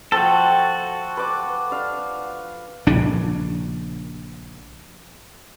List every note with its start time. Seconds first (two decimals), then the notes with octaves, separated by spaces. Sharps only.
0.12 F3 F#4 A4 C5 G5
1.17 B4 D6
1.71 D4 F5
2.87 A#1 C#3 D4